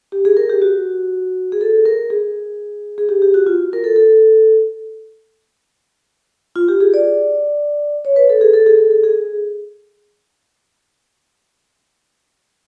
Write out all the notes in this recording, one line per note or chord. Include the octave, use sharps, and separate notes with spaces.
G4
G#4
A#4
G4
F#4
G#4
A4
A#4
G#4
G#4
G4
G4
F#4
F4
A#4
A4
A4
F4
G4
G#4
D5
C#5
B4
A4
G#4
A4
G#4
A4
A4
G#4